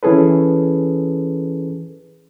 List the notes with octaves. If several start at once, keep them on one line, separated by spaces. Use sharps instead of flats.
E3 C#4 G#4 A4 B4